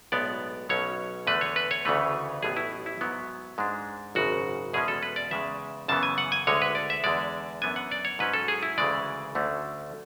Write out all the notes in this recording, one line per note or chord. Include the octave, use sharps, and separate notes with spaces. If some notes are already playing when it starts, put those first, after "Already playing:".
B1 A2 G#3 B3 D5
B1 B2 F#3 C#4 C#5
E2 D3 A3 D4 B4
C#5
B4
C#5
D2 C#3 E3 A3 B4
A1 A2 F#3 B3 G#4
E4
E4
G#2 F#3 B3
G#2 G#3 D4
G#1 F#2 C#3 F#4
E2 B2 G#3 C#4 G#4
A4
B4
D5
E2 C#3 G#3 E5
F#2 C#3 E3 B3 A5
G#5
F#5
G#5
D2 D3 G#3 C#5
B4
D5
E5
E2 D3 G#3 D5
F#2 E3 B3 D4 G#5
F#5
D5
C#5
G#2 F#3 C#4 B4
A4
G#4
E4
D2 C#3 E3 G#3 D5
D2 D3 A3 C#4